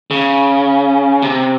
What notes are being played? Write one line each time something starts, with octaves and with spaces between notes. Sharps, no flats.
C#3
C3